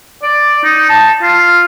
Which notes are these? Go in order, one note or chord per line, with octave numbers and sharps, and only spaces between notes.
D5
D#4
A5
F4